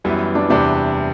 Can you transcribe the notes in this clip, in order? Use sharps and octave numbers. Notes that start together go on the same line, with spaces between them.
F#2 E3 G3 B3 E4
D4
E2 C3 G3 D4